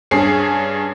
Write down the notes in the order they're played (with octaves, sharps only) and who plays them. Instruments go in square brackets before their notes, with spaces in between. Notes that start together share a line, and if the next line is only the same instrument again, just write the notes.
[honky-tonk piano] G2 C#4 G#4 C7